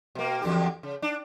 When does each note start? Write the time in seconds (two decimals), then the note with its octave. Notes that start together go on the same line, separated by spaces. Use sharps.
0.15 B2 A#3
0.41 E2 D3 G4
0.83 C#3
1.02 D4